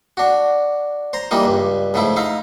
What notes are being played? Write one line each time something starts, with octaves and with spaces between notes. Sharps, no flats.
D4 F#4
C5 A#5
E3 G3 A#3 D#4 F4
C#2 G2
G#2 C#3 F3 A3 E4
D#4 E4 F5